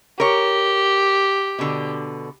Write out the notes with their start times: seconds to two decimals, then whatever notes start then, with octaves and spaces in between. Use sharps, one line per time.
0.20 G4 A#4 C#5
1.59 B2 D3